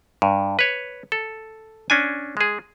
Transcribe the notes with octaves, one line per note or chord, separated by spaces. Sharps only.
G2
B4 C#5
A4
C#4 D4 G#5
G#3 G#4